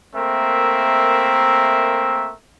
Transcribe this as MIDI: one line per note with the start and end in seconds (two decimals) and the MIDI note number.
0.15 2.33 57
0.15 2.33 58
0.15 2.33 60
0.15 2.33 70
0.15 2.33 76